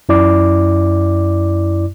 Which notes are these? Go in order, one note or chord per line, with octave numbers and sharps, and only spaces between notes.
F#2 E4 D5 D6